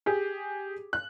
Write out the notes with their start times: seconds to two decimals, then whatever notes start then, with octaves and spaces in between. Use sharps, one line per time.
0.06 G4 G#4
0.93 F#6